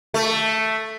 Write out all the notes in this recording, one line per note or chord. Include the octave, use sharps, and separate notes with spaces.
A3